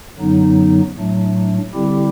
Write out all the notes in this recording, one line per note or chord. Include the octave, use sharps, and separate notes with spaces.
F#2 D3 F#3 B3 D#4
A2 F#3 A3 D4
D3 G3 C4 E4 G4